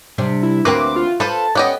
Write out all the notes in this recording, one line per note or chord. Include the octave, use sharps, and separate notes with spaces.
C3 G3 D4
E4
D2 E3 A#3 C4 F#4 B4 D6
F4
F4 A4 B4 C5 A5
B3 C#4 G4 D#5 F#5